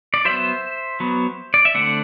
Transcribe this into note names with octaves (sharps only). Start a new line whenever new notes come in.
D5
F#3 B3 C5 E5
F#3 B3
D5
E5
D3 A3 C4 D5 F#5